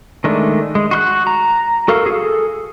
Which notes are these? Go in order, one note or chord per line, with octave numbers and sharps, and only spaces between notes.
D#3 G#3 A3 D4
G#3
F#4 C6 F#6
A#5
F#4 A4 A#4 F5
G#4 A4